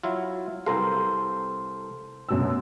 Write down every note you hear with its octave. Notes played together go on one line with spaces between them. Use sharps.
F#3 E4 F4
C2 A4 A#4 C5 F5 C6
F#2 B2 E6